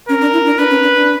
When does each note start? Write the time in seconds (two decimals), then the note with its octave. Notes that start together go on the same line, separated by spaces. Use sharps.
0.08 C#4 A#4
0.21 D4
0.33 E4
0.46 D4
0.58 D4 B4
0.70 C#4
0.83 D4
0.95 D4